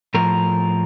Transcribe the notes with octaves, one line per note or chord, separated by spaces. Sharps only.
A2 F3 A#4